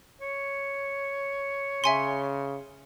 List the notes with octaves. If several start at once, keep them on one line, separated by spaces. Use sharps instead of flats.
C#5
C#3 E5 G#5 C6